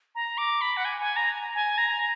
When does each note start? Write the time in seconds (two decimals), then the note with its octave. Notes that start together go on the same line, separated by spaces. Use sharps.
0.15 A#5
0.38 D6
0.61 B5
0.77 F#5
0.85 G#5
1.00 G#5
1.16 A#5
1.55 G#5
1.78 A#5